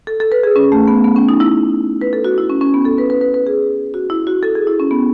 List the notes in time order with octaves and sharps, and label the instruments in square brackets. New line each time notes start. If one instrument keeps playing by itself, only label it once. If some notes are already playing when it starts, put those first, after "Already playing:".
[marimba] A4
A4
B4
G#4
C#4
A3
B3
B3
C#4
D#4
E4
B4
A4
F#4
E4
C#4
C#4
B3
A4
B4
B4
B4
B4
G#4
F#4
E4
F#4
A4
G#4
E4
C#4
B3